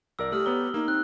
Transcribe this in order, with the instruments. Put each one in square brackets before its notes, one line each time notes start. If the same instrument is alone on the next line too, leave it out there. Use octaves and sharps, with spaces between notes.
[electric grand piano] C2 A#4 D5 [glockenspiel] E6
[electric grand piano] A3 [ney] G4 [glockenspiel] D#6 F6 F#7
[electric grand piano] B3 C#5 A#5 [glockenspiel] G7
[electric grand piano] A#3 [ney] D#4
[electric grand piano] C4 [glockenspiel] F#6